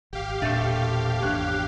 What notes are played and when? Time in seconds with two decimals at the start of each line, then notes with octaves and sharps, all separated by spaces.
0.13 G#1 G4 F5
0.42 E1 A#2 A3 C4 D4 C#6
1.22 G#1 E2 D4 C#5 F#6